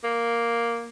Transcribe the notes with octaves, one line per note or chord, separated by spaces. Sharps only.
A#3